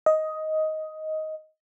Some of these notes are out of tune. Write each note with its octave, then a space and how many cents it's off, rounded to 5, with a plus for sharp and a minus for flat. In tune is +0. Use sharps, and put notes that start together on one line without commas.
D#5 +10